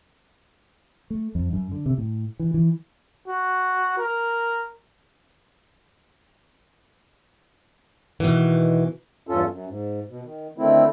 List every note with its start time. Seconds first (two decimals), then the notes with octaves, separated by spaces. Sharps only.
1.10 A3
1.35 F2
1.53 F#2
1.72 D3
1.86 C3
1.98 A2
2.39 E3
2.54 E3
3.28 F#4
3.98 A#4
8.20 B2 D#3 E3
9.27 E2 G2 C#4 F4 A4
9.49 F#2
9.67 G#2
10.09 B2
10.23 D#3
10.58 D3 D#3 A3 C4 E4